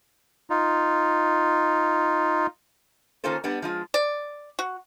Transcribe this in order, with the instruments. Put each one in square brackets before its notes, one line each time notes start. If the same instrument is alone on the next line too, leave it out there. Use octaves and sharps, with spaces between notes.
[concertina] D#4 F4
[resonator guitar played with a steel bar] D#3 A#3 C#4 F4 A4 C5
G3 B3 D4
F3 G#3 F4
[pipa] D5
F#4